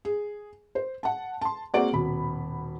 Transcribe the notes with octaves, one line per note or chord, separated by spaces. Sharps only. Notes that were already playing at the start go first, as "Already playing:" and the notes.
G#4
C5
F#5 A5
A5 C6
A#3 C4 F#4 G#4 D5 F#5
D#1 B2 B5